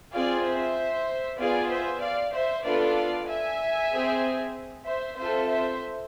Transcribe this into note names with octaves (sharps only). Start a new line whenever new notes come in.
C4 F4 G#4 D5 F5
C5 E5
B3 F4 G#4 D5 F5
C5 E5
D5 F5
C5 E5
B3 D4 F4 A4 D5 F5
E5 G#5
C4 G#4
C5 E5
C4 F4 A4 C5 E5
C5 E5